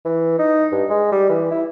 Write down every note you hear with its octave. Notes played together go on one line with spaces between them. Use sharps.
E3
D#4
G2
G#3
G3
E3
E4